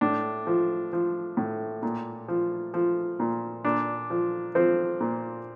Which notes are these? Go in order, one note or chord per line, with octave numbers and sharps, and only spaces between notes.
A2 D4
F3
F3
A2
A#2
F3
F3
A#2
A#2 D4
F3
F3 C4
A#2